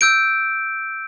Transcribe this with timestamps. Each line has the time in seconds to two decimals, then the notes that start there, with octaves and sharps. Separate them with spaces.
0.01 E6 G6 D7